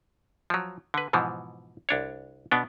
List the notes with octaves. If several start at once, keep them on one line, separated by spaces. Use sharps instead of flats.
F3 F#3
D3 B4
G#2 B2 E3 F3
C2 D4 C#5
B2 B3 D4